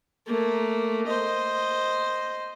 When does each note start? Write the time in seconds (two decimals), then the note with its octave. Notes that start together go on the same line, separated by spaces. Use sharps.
0.27 A3 A#3
1.07 C5 D#5